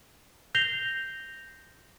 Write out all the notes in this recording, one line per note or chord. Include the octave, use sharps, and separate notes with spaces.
G6 A#6 C7 F7 G7